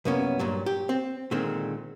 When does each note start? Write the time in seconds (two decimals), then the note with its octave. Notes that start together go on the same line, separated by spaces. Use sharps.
0.05 C2 F#2 A#3 B3 C#4
0.39 G2 A#2 F#3
0.66 G4
0.89 C4
1.31 A#2 D3 D#3 G#3 C4